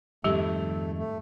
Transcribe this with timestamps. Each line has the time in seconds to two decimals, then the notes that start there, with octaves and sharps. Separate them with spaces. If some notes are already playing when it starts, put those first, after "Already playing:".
0.24 F2 G#2 D#3 G3 A3 G4
0.98 A3